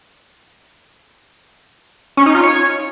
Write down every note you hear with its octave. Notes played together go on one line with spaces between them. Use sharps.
C#4
D#4
F4
C#5